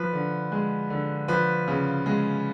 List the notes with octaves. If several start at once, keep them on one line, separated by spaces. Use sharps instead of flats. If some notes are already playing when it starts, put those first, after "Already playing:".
Already playing: F3 B4
D3
G#3
D3
F3 B4
C#3
G#3